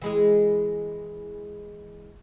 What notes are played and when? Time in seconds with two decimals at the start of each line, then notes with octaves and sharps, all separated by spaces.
0.02 E3 G#3 G#4